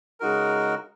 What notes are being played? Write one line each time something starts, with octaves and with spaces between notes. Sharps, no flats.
C#3 G#3 D#4 F#4 A#4